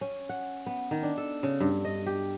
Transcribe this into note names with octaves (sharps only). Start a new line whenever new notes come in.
C#4
F#5
B3
D#3
D4
A4
C#3
G2
D#5
G4